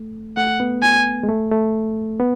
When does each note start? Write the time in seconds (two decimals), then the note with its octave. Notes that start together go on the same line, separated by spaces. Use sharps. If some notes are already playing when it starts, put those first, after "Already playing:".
Already playing: A3
0.37 A3 F#5
0.60 B3
0.83 G#5
1.23 G#3
1.29 A3
1.51 A3
2.19 B3